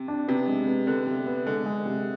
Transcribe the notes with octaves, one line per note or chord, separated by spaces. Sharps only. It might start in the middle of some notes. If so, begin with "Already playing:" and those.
Already playing: C3
D4
C3 B3
G#3
B3
D3 B3
C3
B3
D3 G#3
G#3
C3